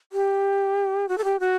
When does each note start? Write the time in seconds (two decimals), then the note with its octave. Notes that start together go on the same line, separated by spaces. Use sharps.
0.12 G4
1.09 F#4
1.18 A4
1.24 G4
1.40 F#4